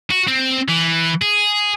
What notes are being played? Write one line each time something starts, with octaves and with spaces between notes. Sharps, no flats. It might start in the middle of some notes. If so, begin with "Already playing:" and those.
F#4
C4
E3
G#4